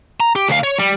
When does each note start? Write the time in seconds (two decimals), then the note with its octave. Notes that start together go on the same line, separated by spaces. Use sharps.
0.20 A#5
0.36 G4
0.48 D2 F5
0.63 C#5
0.79 G3